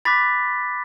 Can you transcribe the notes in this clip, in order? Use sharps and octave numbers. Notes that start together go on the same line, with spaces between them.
B5 D6 F#6 A6 B6